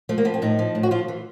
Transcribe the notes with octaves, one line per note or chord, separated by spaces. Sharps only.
F3 A3
A#3
F3 B3
C4
A2 D#4
F3
A2
F#4
F3 F4
E3